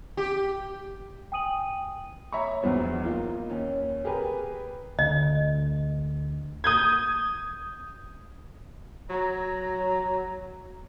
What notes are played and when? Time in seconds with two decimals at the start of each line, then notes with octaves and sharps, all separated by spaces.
0.17 G4
1.32 G5 G#5 D#6 D#7 F#7
2.33 C#5 E5 A#5 B5 C#6
2.62 A#1 E2 G#2 F#3 B3 C5
3.05 A#3 D#4 F4
3.50 D#2 C#4
4.05 G4 G#4 A#4 B4
4.99 D2 D3 D#5
6.64 D#6 G6 G#6
9.10 F#3 A#5